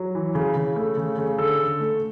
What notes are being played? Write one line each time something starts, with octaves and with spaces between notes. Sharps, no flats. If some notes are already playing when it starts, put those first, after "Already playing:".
Already playing: F#3
E3
C#3
C#3
A3
C#3
C#3
D3 A4
D3
A3